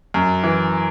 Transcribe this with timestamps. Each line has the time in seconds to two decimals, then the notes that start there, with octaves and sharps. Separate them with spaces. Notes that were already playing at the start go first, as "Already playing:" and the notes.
0.14 F#2
0.43 E3